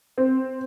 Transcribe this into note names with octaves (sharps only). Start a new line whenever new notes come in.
C4